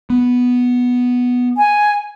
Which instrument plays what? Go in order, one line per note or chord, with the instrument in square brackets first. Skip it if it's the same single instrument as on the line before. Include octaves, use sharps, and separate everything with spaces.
[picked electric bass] B3
[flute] G#5